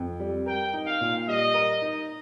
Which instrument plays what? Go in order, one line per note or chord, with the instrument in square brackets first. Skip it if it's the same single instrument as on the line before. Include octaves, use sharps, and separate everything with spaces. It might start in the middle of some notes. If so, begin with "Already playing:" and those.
Already playing: [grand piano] F2
G3
[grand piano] A#4 [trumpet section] G5
[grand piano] D#4
[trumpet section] F5
[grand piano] A#2
[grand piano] G3 [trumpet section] D#5
[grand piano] A#4
D#4